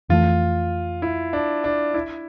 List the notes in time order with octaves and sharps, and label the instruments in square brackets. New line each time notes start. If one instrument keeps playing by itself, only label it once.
[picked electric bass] F2 E3 A3 [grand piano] F4
[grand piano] E4
D4
D4
E4